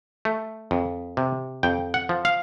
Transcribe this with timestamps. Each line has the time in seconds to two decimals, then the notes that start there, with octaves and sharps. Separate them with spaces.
0.25 A3
0.71 F2
1.17 C3
1.63 F2 G5
1.94 F#5
2.09 F3
2.25 F5